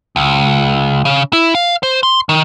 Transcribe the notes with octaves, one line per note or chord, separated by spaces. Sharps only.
C#2
C#3
E4
F5
C5
C6
D#3